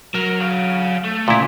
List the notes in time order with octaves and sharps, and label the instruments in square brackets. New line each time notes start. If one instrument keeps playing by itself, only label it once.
[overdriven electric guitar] F#3 [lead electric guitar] A#4
[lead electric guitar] C#5 F5
A3
[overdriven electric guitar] D2 C#3 [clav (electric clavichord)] A#2 E4